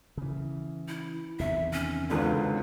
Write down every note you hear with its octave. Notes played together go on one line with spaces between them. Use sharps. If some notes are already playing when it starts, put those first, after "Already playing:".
C#3 E3
E4
E2 C3 D#3 E5
C#4
G#1 C#2 D3 B4